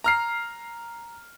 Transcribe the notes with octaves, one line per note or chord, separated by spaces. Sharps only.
A#5 F6 C7